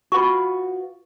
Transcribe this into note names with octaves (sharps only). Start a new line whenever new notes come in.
F4 F#4 B4 C#6